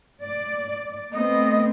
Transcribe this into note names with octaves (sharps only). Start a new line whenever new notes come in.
D5
A3 B3 C4 D#5